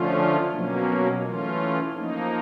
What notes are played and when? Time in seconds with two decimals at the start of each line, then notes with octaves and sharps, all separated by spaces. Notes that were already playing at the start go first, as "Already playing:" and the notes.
Already playing: D3 F3 A3 C#4 F4
0.51 B2 F#3 A#3 C#4
1.22 E3 A3 C#4 F4
1.94 F3 A#3 D#4